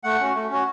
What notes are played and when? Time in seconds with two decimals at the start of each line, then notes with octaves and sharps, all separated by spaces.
0.04 A3 F#5
0.20 C#4 F#4
0.35 A3
0.50 C#4 F#4